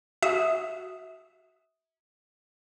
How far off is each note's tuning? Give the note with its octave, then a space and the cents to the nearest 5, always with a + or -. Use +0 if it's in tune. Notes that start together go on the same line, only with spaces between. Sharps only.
F#4 +0 E5 -25 D#6 +0